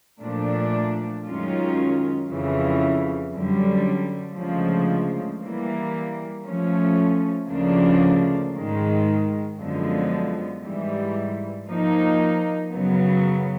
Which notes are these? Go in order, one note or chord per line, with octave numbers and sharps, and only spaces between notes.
A#2 F3 A3 D4
F#2 D#3 G#3 C#4 F4
F2 C#3 E3
F#2 D3 G3
D2 C#3 F3 G#3
E3 G3 A#3
F3 A3 C#4
D2 C#3 F3 A#3 D4
G#2 D#3 G#3
F#2 D3 F3 G#3 B3
G#2 E3 G3
F3 A#3 D#4
F#2 C#3 F#3 B3